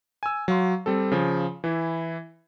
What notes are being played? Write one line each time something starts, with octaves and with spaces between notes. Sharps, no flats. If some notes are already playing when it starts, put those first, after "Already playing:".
G#5 E6
F#3 F5 C6
G3 C4 A4
C#3 F3
E3 E4